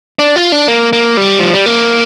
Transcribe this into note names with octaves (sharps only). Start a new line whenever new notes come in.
D4
F4
D4
A#3
A#3
G3
F3
G3
A#3